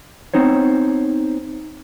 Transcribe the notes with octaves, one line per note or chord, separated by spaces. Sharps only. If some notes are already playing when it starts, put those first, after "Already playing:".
B3 C4 D#4 C5 C#5